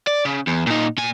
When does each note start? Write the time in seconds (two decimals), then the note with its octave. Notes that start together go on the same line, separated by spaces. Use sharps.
0.07 D5
0.25 C#3
0.47 E2
0.67 A#2 D#4
0.98 A#2 G#5